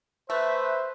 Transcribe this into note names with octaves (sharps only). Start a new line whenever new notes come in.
A3 B4 C5 E5